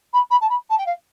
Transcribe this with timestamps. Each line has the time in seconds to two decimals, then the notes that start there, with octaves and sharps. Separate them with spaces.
0.13 B5
0.30 B5
0.41 A5
0.49 B5
0.69 A5
0.78 G5
0.86 F5